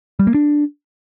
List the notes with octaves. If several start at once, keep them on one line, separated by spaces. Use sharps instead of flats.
G3
A#3
D4